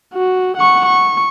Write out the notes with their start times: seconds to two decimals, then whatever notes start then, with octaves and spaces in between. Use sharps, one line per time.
0.14 F#4
0.57 F#5 C#6
0.86 C#6